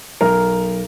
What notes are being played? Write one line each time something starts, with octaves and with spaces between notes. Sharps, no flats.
B1 A#4